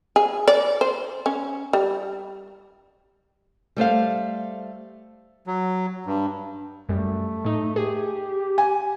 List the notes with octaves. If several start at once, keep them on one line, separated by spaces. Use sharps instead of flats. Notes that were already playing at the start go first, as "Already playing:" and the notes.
G#4
D5
C5
C#4
G3
G3 A3 C5 F5
F#3
G2
F#2 G3 A3
A2 D#4
G4 G#4
G#5